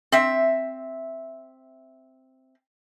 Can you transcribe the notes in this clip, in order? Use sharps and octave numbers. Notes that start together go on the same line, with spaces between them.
C4 E5